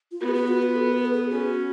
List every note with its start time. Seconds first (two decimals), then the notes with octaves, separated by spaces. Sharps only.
0.11 F4
0.21 B3 F#4
0.28 G#4
0.34 F#4
0.48 F4
0.62 F#4
0.75 A4
0.93 B4
1.05 A4
1.13 G#4
1.30 C#4 F#4